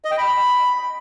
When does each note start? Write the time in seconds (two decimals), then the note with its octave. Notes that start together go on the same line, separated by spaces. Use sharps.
0.05 D#5
0.11 G5
0.18 B5